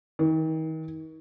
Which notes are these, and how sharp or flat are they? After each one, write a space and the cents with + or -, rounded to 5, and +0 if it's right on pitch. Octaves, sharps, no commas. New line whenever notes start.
D#3 +40